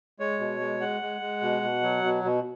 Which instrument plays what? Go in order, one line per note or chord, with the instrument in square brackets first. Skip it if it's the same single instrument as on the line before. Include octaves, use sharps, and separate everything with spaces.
[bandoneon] G#3 C#5
B2
G#3
G#3 F#5
G#3
G#3
B2
B2
F#3
B2
B2